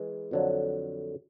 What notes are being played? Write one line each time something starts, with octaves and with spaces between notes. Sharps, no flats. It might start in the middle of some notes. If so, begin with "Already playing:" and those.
Already playing: E3 G#3 E4
F2 D3 F#3